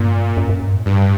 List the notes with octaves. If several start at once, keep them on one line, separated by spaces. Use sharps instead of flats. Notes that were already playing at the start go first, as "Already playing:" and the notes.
Already playing: G2 A#2
F#2
F#2
G2
A2
G2